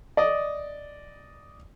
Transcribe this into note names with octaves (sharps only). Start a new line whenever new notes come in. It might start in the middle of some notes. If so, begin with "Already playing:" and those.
D5 D#5